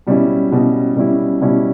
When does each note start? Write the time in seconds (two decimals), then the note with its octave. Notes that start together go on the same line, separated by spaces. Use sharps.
0.07 B2 G3 C#4 E4
0.52 B2 G3 C#4 E4
0.96 B2 G3 C#4 E4
1.42 B2 G3 C#4 E4